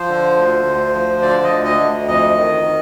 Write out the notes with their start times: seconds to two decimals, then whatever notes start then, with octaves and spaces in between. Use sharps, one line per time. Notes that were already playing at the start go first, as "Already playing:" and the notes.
Already playing: F3 C5
0.09 D3
0.37 D2
0.65 D2
0.94 F3
1.22 D3 D5
1.44 D#5
1.51 D2
1.65 D#5
1.79 D2
2.07 F2 D#5
2.36 D#3
2.64 D#3